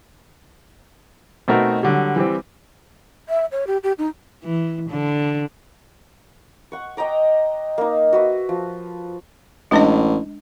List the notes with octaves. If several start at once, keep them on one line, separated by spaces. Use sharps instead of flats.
B2 A3 C4 D#4 F#4 A#4
D3 F#3 G3
E3 G3 C4
E5
C#5
G4
G4
D#4
E3
D3
F#5 C#6
D#5 G5 A#5 D6
A#3 D#4
F#4 B4 E5
F3
A1 G#3 D4 D#5